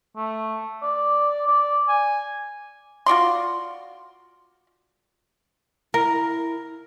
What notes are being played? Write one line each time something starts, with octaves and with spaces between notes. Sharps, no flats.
A3
D5
D5
G#5
F4 F#4 D5 C6
E4 A#4